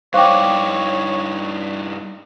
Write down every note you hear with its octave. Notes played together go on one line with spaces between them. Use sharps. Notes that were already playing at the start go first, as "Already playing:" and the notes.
G2 D#4 C5 C#5 F5 G5 C#6 D6